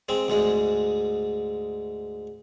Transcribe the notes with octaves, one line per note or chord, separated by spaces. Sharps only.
G#3 C4
D2 G#2 G#3